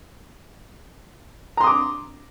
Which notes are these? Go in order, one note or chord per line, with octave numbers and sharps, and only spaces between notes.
A#5 C6 D6 D#6